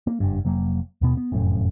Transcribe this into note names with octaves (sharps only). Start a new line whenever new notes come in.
A#3
F#1 G2
F1 F#3 A#3
D#2 B2 B3
B3
F1 F#2 A2